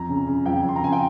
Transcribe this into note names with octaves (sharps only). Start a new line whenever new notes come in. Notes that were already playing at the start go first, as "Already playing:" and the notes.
Already playing: F2 A#5
C#3
C#3
F2 G5
F2
C6
A#5
C#3 G#5
G5